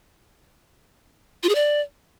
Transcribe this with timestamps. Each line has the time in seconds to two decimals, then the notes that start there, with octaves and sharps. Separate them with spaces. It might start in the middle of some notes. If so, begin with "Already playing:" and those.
1.43 F4
1.49 G#4
1.55 D5